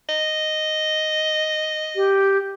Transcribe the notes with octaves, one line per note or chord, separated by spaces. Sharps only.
D#5
G4